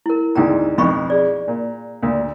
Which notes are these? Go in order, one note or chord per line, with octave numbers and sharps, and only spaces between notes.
E4 A#4
G#1 D2 G#2 E4 G5 A#5
B1 F2 E5 B5 C#6
G#4 D5
A#2
D2 A#2